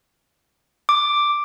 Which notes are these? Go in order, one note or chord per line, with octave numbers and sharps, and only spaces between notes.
D6